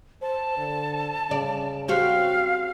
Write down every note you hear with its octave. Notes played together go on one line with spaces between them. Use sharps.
C5 A5
D3
C#3 D5
C4 F#4 G4 F5